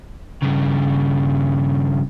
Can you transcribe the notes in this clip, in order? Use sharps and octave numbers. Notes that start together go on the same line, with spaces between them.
G2 C#3